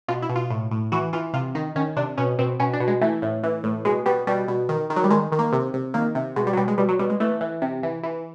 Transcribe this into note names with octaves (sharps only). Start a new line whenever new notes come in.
B2 F4
E4
B2
F4
A2
A2
E3 F#4
E3 F4
C3 F4
D#3 D#4
D#3 C#4
C3 D4
B2 C#4
B2 C4
B2 C#4
D4
B2
G#3
E3 A3
A2
E3
A2
B2 G#3
B2 G3
B2 G3
B2
D#3
D#3
F#3
G3
D#3 G#3
D#3
A#3
C3
C3
D#3 A#3
C3
B2 G#3
G3
F#3
B2 G3
G#3
B2 G3
F#3
B2 G3
G#3
E3 A3
E3
C3
E3
E3